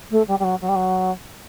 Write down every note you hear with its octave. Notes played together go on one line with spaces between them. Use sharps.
A3
G3
G3
F#3
F#3
G3
F#3